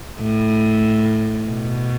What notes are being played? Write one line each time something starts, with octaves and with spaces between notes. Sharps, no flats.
A2
B2